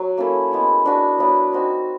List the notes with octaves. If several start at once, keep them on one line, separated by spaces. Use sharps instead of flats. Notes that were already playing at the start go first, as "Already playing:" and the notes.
Already playing: F#3
A#3 C#4 E4 A4
G#3 B3 E4
D4 F#4 B4
F#3 B3 E4
C4 D#4 F#4